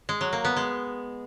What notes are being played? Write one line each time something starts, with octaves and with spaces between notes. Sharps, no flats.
G#3
F#3
A#3
B3
G#3